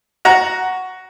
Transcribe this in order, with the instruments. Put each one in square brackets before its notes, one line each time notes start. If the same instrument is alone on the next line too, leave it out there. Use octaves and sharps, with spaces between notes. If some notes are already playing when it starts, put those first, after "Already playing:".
[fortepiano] F#4 A#5